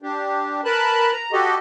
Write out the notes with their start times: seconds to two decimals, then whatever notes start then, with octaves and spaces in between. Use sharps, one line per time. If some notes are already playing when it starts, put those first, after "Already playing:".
0.02 D4 G4
0.65 A#4 B4 A5 B5 F#6
1.12 A#5
1.32 F#4 G4 A4 D#5